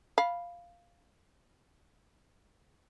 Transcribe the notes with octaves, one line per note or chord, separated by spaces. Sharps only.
F5 B5